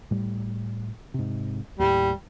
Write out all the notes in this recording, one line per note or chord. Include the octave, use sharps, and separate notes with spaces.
A2 G3
G#2 C3
D#2 A2 G3